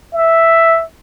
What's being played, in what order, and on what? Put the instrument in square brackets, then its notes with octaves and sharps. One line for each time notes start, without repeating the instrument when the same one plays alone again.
[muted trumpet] E5